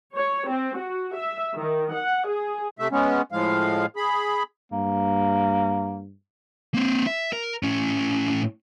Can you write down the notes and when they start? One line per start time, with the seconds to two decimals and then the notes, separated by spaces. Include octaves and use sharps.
0.17 C#5
0.48 C4
0.78 F#4
1.16 E5
1.56 D#3
1.93 F#5
2.28 G#4
2.79 C3 A3 E5
2.91 G#3 B3 C#4
3.32 A2 F3 G#3 F5
3.96 G#4 B5
4.72 G2 A#3
6.74 A#3 C4
7.07 E5
7.33 A#4
7.63 A2 C#4